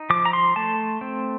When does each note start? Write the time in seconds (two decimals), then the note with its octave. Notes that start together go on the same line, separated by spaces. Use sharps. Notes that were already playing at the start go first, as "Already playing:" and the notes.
Already playing: D#4
0.10 F3 D6
0.25 A#5
0.33 C6
0.56 A3 A5
1.01 C4